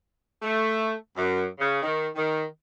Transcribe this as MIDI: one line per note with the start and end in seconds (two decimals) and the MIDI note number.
0.41 0.92 57
1.16 1.44 42
1.58 1.79 49
1.82 2.06 51
2.16 2.43 51